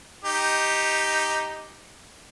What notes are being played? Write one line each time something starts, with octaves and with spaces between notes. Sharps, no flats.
D#4 G4